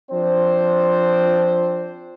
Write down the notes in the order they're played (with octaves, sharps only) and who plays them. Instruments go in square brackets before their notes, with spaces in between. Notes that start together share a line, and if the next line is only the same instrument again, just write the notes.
[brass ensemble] F3 C4 D4 C5